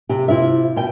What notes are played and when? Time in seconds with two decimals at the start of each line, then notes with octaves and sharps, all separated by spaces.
0.09 C3 G4
0.28 C3 E4 F4 E5
0.76 B2 G5